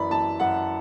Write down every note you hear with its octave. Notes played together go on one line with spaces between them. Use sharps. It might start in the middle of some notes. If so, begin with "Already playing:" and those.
Already playing: F#2 E3 D5 B5
E3 A5
F#2 F#5